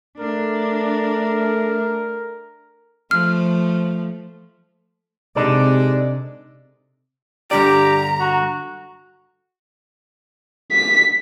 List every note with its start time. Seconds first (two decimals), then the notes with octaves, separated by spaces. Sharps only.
0.20 A3 D4 A#4
3.11 F3 A3 F6
5.36 C3 G#3 D4 D#4 A4 D5
7.51 G2 D3 G4 D5 A#5
8.20 F#4
10.72 B6